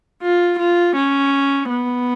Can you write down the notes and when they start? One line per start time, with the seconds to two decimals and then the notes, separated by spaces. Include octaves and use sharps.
0.22 F4
0.59 F4
0.96 C#4
1.70 B3